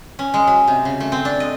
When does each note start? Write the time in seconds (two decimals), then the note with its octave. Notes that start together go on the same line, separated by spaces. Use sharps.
0.19 C#4
0.34 G#3
0.47 F#3
0.68 C3
0.85 C#3
1.00 A3
1.12 C4
1.25 D4
1.40 D#5